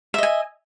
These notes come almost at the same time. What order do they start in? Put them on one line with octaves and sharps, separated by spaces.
E5 D#5 G#5